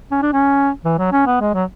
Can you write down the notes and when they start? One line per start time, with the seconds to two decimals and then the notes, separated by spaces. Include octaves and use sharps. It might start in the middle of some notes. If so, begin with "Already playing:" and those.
0.12 C#4
0.22 D4
0.33 C#4
0.85 E3
0.99 F#3
1.12 C#4
1.27 B3
1.41 G#3
1.54 F#3